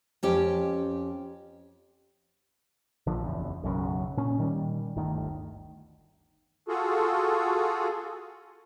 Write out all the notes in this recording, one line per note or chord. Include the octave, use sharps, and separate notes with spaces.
F2 C#4 G4
A#1 D3 F3
F#1 E2
B1 F#2 C#3
A#2 C#4
A#2 D#3 G3
G1 D2 D#3
F4 F#4 G#4 A4